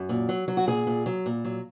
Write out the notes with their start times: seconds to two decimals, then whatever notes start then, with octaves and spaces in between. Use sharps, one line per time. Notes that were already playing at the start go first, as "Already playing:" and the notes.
Already playing: F#2
0.09 A#2
0.29 F#3
0.48 F#3
0.57 F#4
0.67 A#2 G#4
0.87 A#2
1.06 F#3
1.26 A#2
1.44 F#3